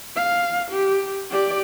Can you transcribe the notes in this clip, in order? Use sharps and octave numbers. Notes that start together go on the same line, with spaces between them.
F5
G4
G4 D5